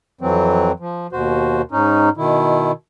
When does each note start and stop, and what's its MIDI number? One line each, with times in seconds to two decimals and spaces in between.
0.21 0.72 41
0.21 0.72 52
0.21 0.72 54
0.21 0.72 60
0.80 1.07 53
1.12 1.62 39
1.12 1.62 47
1.12 1.62 66
1.12 1.62 72
1.71 2.09 44
1.71 2.09 61
1.71 2.09 63
2.17 2.72 47
2.17 2.72 51
2.17 2.72 64